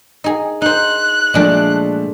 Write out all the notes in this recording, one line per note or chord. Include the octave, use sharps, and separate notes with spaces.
D#4 G#4
D#4 C5 F#6
A#2 F3 G#3 A3 D4